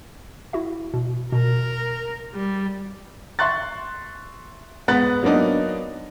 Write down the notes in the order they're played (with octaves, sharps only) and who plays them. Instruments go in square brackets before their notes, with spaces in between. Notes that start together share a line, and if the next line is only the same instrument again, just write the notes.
[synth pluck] E4 F#4 E5
B2
[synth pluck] B2 [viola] A#4
[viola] G3
[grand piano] E5 C6 C#6 F#6 A6
G#2 B3 B4 B5 F#6 A6
F#3 A#3 B3 D4 D#4